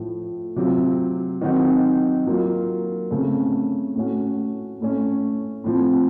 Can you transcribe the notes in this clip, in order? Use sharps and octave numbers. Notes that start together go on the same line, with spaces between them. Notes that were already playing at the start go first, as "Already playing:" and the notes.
Already playing: A2 F3 A3
C3 F#3 C4 F4
D#3 F#3 C4 D#4 F#4
F#3 A#3 F4
C#3 A3 C4
A2 A3 C#4 F#4
A2 A3 C#4
A2 F3 C4